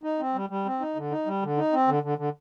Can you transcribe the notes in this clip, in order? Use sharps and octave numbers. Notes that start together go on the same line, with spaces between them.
D#4
C4
G3
G3
C4
D#4
D3
D#4
G3
D3
D#4
C4
D3
D3
D3